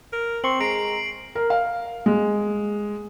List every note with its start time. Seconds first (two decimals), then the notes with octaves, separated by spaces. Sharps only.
0.13 A#4
0.44 C4 C6 C#6 F#7
0.60 G#3 A#5 C7 D7
1.35 A#4
1.50 F5
2.06 G#3